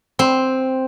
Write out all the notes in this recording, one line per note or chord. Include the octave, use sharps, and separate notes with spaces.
C4